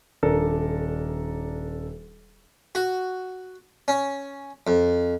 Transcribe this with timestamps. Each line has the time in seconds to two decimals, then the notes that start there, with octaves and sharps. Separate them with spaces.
0.23 D#1 D4 A4 A#4
2.75 F#4
3.88 C#4
4.67 F2